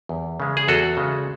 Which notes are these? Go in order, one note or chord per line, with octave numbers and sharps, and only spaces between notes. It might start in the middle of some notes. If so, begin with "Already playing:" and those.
E2
C#3 G#3
G#4
E2 F#4 A4
C#3 G#3